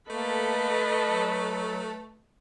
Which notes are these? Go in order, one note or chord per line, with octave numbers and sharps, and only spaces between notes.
A3 A#3 A4 B4 D#5 B5
F#3